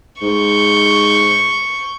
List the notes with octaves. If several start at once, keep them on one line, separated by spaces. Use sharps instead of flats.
G#2 C#6 G6